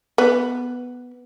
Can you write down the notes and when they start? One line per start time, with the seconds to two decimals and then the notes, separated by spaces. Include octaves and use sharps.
0.18 B3